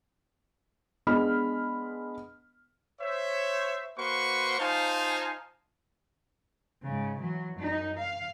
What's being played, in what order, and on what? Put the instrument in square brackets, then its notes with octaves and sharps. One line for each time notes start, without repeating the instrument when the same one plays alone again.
[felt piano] G#3 B3 D4 D#5 B5 F6
[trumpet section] C5 C#5 E5
A#3 F#4 B4 C5 C6 C#6
D#4 F4 C5 F5 G#5 A5
[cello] G#2 C#3
E3 F#3
F#2 D#4
F5